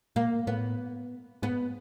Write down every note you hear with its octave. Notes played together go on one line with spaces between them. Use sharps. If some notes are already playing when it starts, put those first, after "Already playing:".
A#2 A#3
A2 B3
G#2 B3